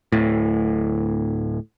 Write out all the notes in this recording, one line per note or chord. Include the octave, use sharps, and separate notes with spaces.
D1 A2